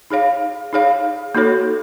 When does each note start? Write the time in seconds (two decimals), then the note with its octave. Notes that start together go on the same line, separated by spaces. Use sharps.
0.10 D#4 G#4 C#5 F5
0.73 D#4 G#4 C#5 F5
1.35 A#3 D#4 F#4 A4 C#5